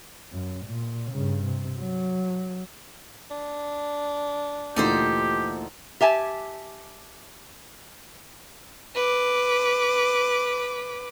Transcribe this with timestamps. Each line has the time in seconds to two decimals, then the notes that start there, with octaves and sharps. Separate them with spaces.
0.32 F#2
0.65 A#2
1.12 G2 C#3
1.45 C3
1.79 F#3
3.31 D4
4.76 D2 A#2 E3 D#4 G4 A4 C5
6.01 G4 E5 G#5 A5
8.95 B4 D6